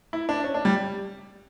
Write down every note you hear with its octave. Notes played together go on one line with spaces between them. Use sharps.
E4
D4
C#4
D4
G3